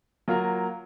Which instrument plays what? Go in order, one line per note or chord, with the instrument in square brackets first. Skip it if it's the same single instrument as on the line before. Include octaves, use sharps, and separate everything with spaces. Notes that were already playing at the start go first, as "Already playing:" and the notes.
[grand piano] F#3 A#3 F4 A#4